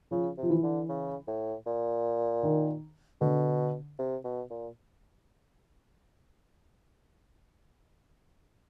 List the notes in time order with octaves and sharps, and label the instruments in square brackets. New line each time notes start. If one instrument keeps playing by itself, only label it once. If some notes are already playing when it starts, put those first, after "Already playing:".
[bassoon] C#3 [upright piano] F3
[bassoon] C3
[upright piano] F3
E3
[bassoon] D3
C#3
A2
A#2
[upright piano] D#3
[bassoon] B2 [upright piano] D3
[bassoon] C3
B2
A#2